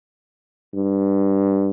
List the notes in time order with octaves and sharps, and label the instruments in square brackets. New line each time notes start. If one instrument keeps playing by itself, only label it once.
[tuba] G2